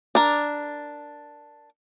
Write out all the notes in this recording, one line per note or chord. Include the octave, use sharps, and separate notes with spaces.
D4 A#4